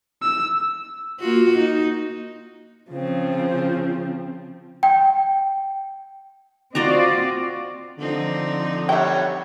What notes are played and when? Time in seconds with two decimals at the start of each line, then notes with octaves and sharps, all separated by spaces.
0.22 E6
1.20 A#3 F4 F#4
1.57 D#4
2.90 C#3 F3 C4
4.83 G5
6.75 C4 F4 F#4 D5 D#5 A#5
7.98 D3 F3 C4 D#4
8.89 G3 C#5 E5 F#5 G5